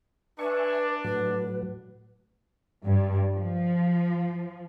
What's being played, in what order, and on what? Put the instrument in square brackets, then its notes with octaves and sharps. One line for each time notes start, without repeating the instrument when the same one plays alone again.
[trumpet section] D4 [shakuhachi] B4 [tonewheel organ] E5 G#5 C#6
[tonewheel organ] A2 F#3 [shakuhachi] B4
[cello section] G2
F3